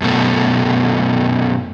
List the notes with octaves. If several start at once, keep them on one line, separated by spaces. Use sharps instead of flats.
F#2 B2 A3